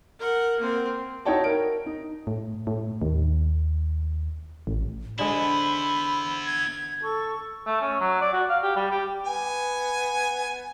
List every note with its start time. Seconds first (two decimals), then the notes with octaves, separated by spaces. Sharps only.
0.19 A#4 F#5
0.59 A#3 C4
1.25 D#4 E4 F#4 C#5 G5 A5
1.44 A#4 D7
1.86 D#4
2.27 A2
2.67 A2
3.02 D#2
4.67 A1
5.19 D3 G#3 B3 E4 C5 B5
6.45 G#6
7.03 A4 C#6
7.67 A3
7.81 C#4
8.00 F#3
8.21 D5
8.33 F#4
8.49 F5
8.63 G4
8.76 G3
8.91 G4
9.24 B3 G#5